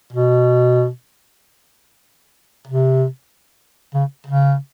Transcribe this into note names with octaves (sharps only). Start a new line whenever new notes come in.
B2
C3
C#3
C#3